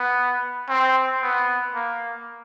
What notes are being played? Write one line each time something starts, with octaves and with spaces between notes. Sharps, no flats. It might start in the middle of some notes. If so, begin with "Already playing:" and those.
Already playing: B3
C4
B3
A#3